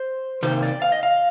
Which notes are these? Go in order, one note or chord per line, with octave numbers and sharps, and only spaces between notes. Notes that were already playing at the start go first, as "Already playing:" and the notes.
Already playing: C5
C3 D#3 A#3 C5
D5
F5
D#5
F5